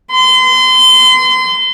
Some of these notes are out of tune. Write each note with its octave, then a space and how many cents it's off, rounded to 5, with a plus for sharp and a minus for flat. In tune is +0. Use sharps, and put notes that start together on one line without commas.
C6 -30